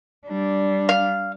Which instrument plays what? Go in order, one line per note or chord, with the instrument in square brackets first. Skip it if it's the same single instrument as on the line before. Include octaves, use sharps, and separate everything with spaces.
[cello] G3 D4
[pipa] F5